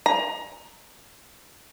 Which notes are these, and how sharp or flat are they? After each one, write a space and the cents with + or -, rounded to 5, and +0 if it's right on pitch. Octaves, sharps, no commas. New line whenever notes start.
A#5 +25